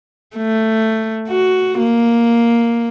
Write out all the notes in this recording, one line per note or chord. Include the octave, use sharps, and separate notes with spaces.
A3
F#4
A#3